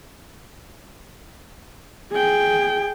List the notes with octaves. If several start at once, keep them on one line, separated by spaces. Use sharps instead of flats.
G#4 G5